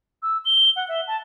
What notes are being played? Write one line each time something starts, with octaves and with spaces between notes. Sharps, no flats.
E6
G7
F#5
E5
A5